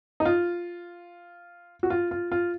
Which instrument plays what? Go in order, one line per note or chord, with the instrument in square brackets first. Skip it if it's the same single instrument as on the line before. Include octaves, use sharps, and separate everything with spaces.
[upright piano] D#4
F4
F#4
F4
F4
F4